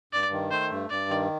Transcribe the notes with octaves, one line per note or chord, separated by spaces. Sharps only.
G2 D5
D#3
A3 C5
G2
G2 D5
D#3